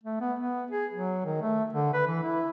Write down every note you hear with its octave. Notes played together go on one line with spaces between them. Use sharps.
A3
B3
B3
G#4
F#3
D#3
A3
D3
B4
E3
E4